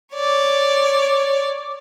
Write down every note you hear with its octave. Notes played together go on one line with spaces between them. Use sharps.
C#5 D5